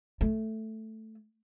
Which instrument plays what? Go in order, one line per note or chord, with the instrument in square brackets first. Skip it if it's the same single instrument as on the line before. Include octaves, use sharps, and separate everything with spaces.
[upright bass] A3